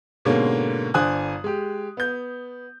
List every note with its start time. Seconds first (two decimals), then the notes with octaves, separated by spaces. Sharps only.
0.25 G#2 B2 D3 G#3 A#3 C#4
0.94 G1 D4 C5 G#5 D#6 F#6
1.44 G#3 G4
1.97 B3 G6